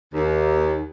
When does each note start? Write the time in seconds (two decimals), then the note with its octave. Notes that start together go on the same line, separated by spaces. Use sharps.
0.12 D#2